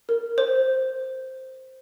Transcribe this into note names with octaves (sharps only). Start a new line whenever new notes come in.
A#4
C5